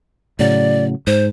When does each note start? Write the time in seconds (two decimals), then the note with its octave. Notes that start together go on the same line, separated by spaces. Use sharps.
0.39 A2 C#3 F#3 D5
1.07 G#2 C5